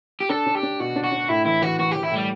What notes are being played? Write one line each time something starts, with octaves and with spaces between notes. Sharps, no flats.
G4
D4 A4
D4
G4
D4
B2 F#4
D4
F#4
D4
A2 E4
E3 E4
E3 F#4
E3 F#4
E3 G4
E4
A2 G3